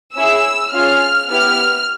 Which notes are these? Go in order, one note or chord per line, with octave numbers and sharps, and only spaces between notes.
C#4 E4 G#4 E6
C#4 F4 G#4 F6
B3 E4 G4 F6